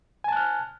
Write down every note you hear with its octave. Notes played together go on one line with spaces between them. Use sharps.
G#5 A5 F6 F#6